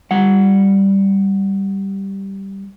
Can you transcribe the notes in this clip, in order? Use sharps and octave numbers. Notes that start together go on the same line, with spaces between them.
G3 F#5